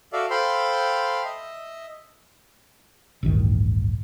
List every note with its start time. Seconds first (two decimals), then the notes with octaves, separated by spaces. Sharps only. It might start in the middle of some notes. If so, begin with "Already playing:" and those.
0.13 F#4 A4 D5 E5 F5
0.30 A4 C5 F5 G5 B5 C6
1.24 D#5 E5
3.23 A1 D2 G2 D#3